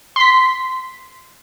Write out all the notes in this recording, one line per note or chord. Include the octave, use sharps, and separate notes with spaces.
C6 B6